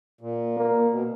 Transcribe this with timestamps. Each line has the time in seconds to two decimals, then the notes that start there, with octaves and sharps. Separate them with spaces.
0.21 A#2
0.57 A#3
0.91 B2